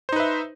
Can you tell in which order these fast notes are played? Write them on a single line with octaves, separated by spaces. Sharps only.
C5 D#4 B4 E5